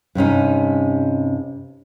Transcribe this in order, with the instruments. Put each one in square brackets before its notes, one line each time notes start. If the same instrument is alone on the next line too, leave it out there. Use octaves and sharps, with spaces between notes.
[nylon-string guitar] G2 C3 C#4 D#4